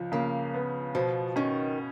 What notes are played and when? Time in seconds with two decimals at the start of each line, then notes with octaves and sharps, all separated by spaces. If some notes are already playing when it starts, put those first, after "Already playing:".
Already playing: C#2 F3
0.12 C#3 A#3
0.54 B3
0.95 B2 F3
1.36 D#3 C#4